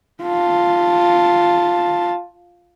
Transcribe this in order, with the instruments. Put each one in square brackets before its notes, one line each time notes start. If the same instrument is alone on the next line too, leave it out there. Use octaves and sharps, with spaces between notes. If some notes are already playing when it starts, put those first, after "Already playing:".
[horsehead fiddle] F4 A5